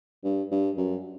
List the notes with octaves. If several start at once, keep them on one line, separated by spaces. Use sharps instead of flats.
G2
G2
F#2